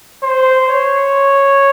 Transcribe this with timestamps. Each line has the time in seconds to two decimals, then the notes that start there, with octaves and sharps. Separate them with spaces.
0.23 C5
0.69 C#5